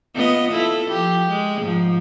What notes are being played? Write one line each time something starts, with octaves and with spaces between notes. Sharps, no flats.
B3 F4 D#5
E4 F4 A4
F3 G4
G#3
G#2 F3